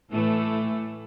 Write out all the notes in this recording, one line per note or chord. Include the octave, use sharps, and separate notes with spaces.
A2 E3 A3